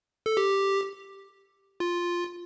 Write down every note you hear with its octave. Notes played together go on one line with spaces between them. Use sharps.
A4
G4
F4